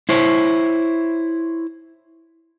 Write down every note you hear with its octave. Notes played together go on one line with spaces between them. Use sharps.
E4 C5 C#5